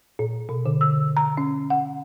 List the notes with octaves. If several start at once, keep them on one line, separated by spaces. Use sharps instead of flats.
A#2
B2
D3
E6
A#5
C#4
F#5